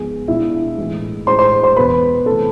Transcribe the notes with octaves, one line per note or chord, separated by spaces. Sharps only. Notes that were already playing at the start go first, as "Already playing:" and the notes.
Already playing: G#2 F3 G#3 B3 G#4 G#5
B2 G#3 D4 E4 F4 E5
A2 E3 G#3
A2 G#3 D4 C5 C6
C5 C6
C5 C6
E2 B2 B3 B4 B5
C3 E3 A3 A4 A5